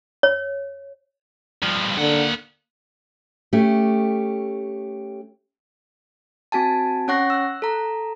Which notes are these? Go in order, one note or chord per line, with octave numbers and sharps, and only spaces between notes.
C#5
G2 F3
D3 A#3 F#5
A3 C#4 G4
C4 F#4 G#5 A5
C#4 C#5 F#5 C#6 F#6 A#6
E6 F#6
A4 A#5